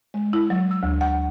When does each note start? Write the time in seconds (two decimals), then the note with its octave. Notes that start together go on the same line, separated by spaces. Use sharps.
0.14 G#3
0.33 E4
0.50 F#3
0.71 E6
0.83 D2
1.01 F#5